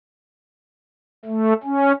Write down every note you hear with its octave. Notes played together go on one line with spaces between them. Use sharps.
A3
C#4